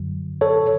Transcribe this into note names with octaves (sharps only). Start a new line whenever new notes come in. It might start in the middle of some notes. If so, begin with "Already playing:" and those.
Already playing: F#2 D3 F#3
A4 C#5